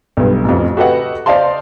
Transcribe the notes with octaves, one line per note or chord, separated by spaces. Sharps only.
B1 G2
A1 F2
F#4 G4 A4 B4 D#5 F#5
C5 D5 D#5 F5 A5 C6